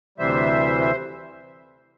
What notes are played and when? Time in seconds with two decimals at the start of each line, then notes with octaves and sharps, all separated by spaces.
0.18 D2 C3 E3 G3 C5 E5
0.81 E5